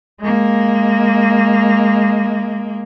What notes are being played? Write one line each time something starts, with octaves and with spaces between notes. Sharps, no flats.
G#3 A#3